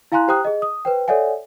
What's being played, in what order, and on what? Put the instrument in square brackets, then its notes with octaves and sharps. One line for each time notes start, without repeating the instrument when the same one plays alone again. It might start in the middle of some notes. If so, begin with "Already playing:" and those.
[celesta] E4 F5 G#5 A#5 C6 F#6
G4 C5 G5 A#5 D#6 F#6
G#4 D#5
D#6
B4 C5 G5
A4 C#5 D5 E5 F#5 G#5